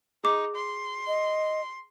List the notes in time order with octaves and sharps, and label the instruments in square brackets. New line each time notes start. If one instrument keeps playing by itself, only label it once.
[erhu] D#4 [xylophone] G#4 D6
[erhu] C6
[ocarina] D#5